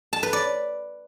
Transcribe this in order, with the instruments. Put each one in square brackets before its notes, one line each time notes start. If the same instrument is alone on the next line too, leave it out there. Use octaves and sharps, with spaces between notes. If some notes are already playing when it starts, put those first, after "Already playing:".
[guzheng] A5
B4
D5